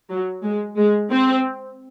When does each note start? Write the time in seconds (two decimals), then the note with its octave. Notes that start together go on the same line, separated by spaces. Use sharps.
0.10 F#3
0.43 G#3
0.77 G#3
1.11 C4